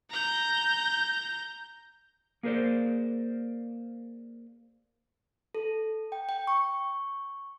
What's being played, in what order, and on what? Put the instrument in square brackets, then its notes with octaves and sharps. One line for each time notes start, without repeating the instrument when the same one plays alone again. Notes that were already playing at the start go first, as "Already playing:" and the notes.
[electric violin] A#5 G6
[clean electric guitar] A#3 G#4 A#4 C5 D5
[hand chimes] A4
G5
G5
C#6